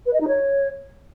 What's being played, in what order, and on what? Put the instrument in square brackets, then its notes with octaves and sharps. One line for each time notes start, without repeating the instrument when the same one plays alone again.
[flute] B4
D#5
D#4
C#5